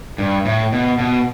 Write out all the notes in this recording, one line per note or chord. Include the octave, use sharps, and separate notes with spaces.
G2
A2
B2
B2